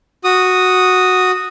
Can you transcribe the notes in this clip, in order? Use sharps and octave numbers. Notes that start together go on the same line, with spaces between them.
F#4 D#6